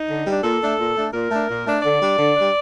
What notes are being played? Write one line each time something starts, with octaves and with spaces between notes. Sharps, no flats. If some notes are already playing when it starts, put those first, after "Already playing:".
Already playing: D#4
D3
G3 D4
A#2 A4
A3 D4
A#2
A3 D4
A#2 A#4
A3 D4
A#2
A3 D4
D3 D5
G3 D4
D3
G3 D4